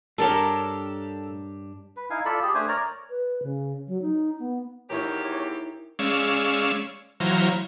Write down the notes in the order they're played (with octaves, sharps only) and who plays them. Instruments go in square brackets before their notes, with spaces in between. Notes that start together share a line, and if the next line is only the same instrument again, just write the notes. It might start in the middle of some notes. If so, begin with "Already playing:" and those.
[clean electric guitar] G2 D4 G4 [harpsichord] A4 [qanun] A#4 C#5
[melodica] B4
D#4 E4 F5 G#5
F4 A4 D5 B5
G4 G#4
A3 D4 C5 G#5
A#4 C#5 D5 A#5
[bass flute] B4
C#3
F#3
D#4
B3
[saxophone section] E2 G4 [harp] D#4 E4 A#4 [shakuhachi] C#5
[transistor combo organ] G#3 C#4 D5 F5 C#6 E6
E3 F#3 C5 C#5 F5 A#5